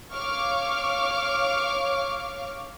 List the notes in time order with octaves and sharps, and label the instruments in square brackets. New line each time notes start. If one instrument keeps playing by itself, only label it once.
[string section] C#5 F5 C#6 D6 F6